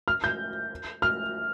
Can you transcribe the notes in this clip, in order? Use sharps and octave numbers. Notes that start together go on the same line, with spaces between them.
F6
G6
F6